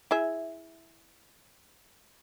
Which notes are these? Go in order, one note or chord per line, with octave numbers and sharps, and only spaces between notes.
E4 G#4 E5